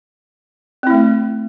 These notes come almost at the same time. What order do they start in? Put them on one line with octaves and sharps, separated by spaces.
C4 E4 A3